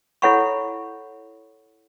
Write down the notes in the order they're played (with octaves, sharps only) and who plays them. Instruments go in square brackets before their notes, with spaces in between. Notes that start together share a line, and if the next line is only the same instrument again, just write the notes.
[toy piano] E4 A4 C#5 F#5 B5 C#6